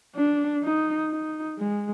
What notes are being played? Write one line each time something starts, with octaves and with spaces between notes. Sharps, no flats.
D4
D#4
D#4
G#3